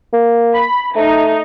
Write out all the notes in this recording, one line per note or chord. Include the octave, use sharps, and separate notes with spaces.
A#3
B5
A3 D#4